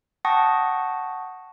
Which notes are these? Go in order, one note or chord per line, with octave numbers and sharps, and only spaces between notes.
F#5 G5 A5 C#6 D#6 A#6